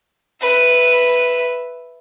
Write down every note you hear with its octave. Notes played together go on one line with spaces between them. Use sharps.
B4 E5